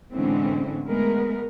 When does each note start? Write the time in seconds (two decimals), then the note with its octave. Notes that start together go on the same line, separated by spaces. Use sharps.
0.12 A2 D3 E3 G#3 C4 C#4
0.87 G#3 A3 B3 A#4